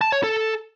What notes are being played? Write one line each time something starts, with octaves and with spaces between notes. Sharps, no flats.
A5
C#5
A4